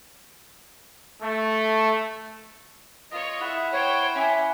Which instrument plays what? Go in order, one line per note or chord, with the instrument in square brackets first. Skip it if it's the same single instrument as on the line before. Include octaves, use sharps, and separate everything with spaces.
[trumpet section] A3
[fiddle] F4 C#5 [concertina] D#5
[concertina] E4 F#5 [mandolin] G#4 [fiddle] E5
[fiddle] C5 G5 [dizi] C#5
[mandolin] C#4 G#5 D6 [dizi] E5